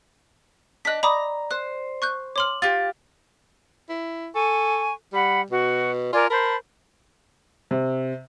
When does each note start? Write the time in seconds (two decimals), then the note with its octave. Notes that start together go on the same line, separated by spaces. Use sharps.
0.85 D4 D#5 F#6 B6
1.03 D5 A#5 B5 D6 D#6
1.51 C5 F#6
2.02 C#6 F#6 G6
2.36 C#5 C6 D6 F6 F#7
2.62 F4 G4 A6
3.89 E4
4.35 A4 G#5 C#6
5.13 G3 F#5 B5
5.50 B2 F#4
6.13 F4 A#4 D5 G#5
6.30 A#4 C5 A5 B5
7.71 C3